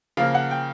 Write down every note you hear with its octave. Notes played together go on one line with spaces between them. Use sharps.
C#3 F3 A#3 F5
F#5
G5